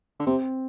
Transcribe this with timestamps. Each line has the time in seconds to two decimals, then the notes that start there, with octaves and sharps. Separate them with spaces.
0.19 D3
0.26 C3 C4